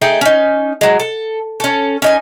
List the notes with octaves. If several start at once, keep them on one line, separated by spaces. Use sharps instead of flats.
A3 D#4 G#4 G5
C#4 D#4
F#3 G#3
A4
C#4 A4
C#4 D#4 G#5